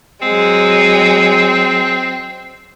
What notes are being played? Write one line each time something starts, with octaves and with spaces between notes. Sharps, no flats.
F#3 G#3 C4